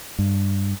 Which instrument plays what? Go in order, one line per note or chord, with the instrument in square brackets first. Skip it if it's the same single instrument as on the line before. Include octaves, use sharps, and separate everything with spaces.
[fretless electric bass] G2